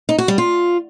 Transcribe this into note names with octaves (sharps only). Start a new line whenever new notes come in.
D#4
F#4
G3
F4